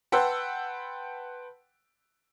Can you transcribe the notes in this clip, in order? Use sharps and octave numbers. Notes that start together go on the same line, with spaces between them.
B4 F#5 G5 A5 C6 E6